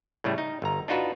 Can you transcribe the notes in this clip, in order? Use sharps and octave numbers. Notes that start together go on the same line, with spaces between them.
A2 C#3 G3 A3
D#4
G1 A#5
D4 D#4 F4 F#4 B4